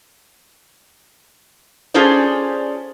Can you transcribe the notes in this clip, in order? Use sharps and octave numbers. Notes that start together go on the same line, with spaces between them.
C#4 F4 G#4 A4 C5 D5